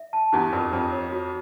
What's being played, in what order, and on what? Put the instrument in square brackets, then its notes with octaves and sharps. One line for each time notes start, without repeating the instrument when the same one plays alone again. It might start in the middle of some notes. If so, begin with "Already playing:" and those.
Already playing: [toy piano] E5
A5
[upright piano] E2 E3 [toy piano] G4
[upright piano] F2 F3 [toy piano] A#4
[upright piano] F2 F3 [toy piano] A#4
[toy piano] C#5
F#4